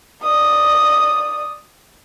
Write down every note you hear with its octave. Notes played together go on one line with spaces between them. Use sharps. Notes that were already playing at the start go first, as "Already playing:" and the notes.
D5 D#6